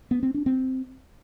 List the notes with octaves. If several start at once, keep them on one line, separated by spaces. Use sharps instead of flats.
B3
C4
D4
C4